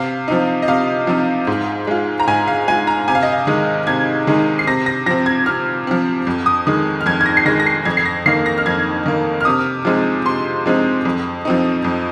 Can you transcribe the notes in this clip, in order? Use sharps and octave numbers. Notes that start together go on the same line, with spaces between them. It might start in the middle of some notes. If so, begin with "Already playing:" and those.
Already playing: C3 F5
F3 C4 D#4
D#5
C3 F5
F3 C4 D#4
G#2
G#3 F4
A#5
G#2 G#5
F5
G#3 F4 G#5
A#5
C3 G#5
F5
D#5
F5
D#3 G#3 D#4
C3 G#6
D#3 G#3 D#4
C7
C3 A#6
A#6
F3 C4 A#6
G#6
C3 F6
F3 C4
F2
D#6
D#3 G#3 D#6
F6
F2 G#6
G#6
A#6
C7
D#3 G#3 A#6
A#6
C7
F2 G#6
C7
A#6
D#3 A#3 C7
A#6
F6
F2 G#6
D#3 A#3
F6
C3 D#6
F3 G#3 C4 D#4
C3 C6
F3 G#3 C4 D#4
F2
F3 C4 D#4
F2